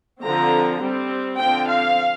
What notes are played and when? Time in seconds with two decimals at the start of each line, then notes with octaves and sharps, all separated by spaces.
0.22 D3 F3 C4 A#5
0.80 G3 C4
1.38 D3 F3 C4 G5
1.68 F5